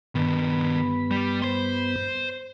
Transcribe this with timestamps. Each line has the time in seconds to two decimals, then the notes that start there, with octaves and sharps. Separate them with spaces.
0.15 G2 D#3 B3 D4 B5
1.11 G3
1.42 C5 C6